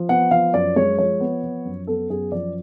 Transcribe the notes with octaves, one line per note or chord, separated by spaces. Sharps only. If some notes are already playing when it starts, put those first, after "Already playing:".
Already playing: F3
B3 F#5
F3 F5
F#2 D5
G#3 C#5
F3 C#5
B3
F3
F#2
B3 A4
F#2 G#4
F3 D5